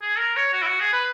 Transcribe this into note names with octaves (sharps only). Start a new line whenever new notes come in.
G#4
A#4
C#5
F#4
E4
F#4
G#4
B4